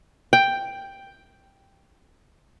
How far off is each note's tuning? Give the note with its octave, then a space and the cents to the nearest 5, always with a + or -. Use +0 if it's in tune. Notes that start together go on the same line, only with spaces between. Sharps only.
G5 +5